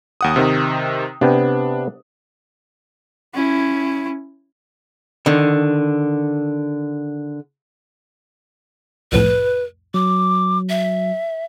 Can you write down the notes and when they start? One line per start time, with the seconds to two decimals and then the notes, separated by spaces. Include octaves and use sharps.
0.21 D#2 F#5 D#6
0.36 C3 D#3
1.21 C3 B3 D4 G5
3.34 C#4 E4
5.26 D3 D#3
9.12 C2 F2 A2 B4
9.94 F#3 D6
10.69 E5